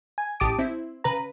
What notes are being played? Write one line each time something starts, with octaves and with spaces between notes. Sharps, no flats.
G#5
A1 G4 A5 D6 D#6 D7
C4 E4
C#3 B4 A#5